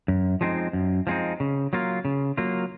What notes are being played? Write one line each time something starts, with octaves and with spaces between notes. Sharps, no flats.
F#2
F3 G#3 C4 D#4
F#2
F3 G#3 C4 D#4
C#3
F#3 A#3 F4
C#3
F#3 A#3 F4